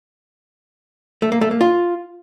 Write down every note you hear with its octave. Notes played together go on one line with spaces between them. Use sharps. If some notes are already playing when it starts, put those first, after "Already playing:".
A3
A#3
A3
A#3
F4